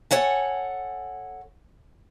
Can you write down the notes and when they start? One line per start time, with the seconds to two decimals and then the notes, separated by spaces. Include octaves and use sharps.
0.11 A4 C#5 F#5 G#5